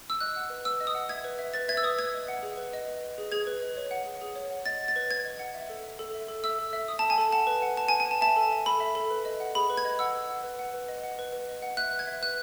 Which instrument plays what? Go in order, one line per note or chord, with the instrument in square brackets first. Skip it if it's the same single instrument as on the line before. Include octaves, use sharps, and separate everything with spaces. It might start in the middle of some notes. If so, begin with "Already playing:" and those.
[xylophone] E6
D#5 F#6
F#5
B4
B4 E6
D#5
D#6
F#5
E5 G#6
B4
E5
B4 A6
E5 G#6
E6
B4 D#6
B4 G#6
D#5
F#5
G#4
B4
D#5
B4
D#5
G#4
G#4 G#6
B4
D#5
C#5
F#5
G#4
G#4
C#5
F#5
D#5 A6
F#5
A6
B4
B4 G#6
D#5
F#5
E5
A4
E5
A4
E5
A4
E5 E6
A4
E5
A4 D#6
A5
E5
G#5
A4 A5
F#5 A5
B4
F#5
B4 A5
G#5
F#5
G#5
B4 A5
E5 A5
A4
E5
A4 B5
E5
A4
B4
D#5
F#5
G#4 B5
B4
G#6
D#5
F#5 E6
B4
F#5
B4
F#5
B4
D#5
F#5
B4
B4
D#5
F#5
E5 F#6
B4
G#6
E5
B4 F#6